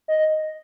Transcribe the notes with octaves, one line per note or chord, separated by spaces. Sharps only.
D#5